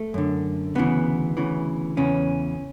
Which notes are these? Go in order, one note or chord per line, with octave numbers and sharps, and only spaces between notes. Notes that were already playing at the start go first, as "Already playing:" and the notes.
Already playing: A3
F#2 D3
D2 C#3 E3 B3
D2 C#3 E3
E2 C#3 E3 C#4